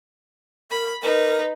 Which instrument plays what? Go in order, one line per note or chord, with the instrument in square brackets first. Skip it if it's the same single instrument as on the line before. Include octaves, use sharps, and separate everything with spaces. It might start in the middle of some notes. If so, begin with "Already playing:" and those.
[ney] A#4 [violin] B5
[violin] D#4 B4 [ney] A#4